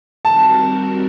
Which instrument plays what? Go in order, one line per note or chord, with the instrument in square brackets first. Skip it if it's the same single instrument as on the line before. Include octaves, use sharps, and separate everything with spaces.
[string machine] D#3 G3 C4 F#4 A#4 [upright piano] A5